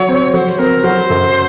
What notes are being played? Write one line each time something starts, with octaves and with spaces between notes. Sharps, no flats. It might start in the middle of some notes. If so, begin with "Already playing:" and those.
Already playing: F#3 C#5
C4
F#3 C5
C4 A#4
F#3 C5
F#2